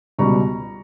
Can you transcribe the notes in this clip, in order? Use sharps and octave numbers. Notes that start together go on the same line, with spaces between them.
C#2 B2 G3 A#5 C#6